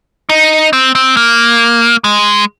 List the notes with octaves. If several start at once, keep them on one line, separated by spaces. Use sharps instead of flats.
D#4
C4
C4
A#3
G#3